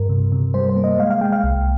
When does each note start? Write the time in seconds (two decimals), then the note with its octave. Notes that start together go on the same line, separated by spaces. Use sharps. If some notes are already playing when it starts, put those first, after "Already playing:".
Already playing: G2 A#4
0.09 C3
0.32 C3
0.54 G3 C5
0.69 C5
0.76 A#3
0.84 D#5
0.99 G#3 F5
1.10 F5
1.21 G#3 G5
1.32 F5
1.44 C2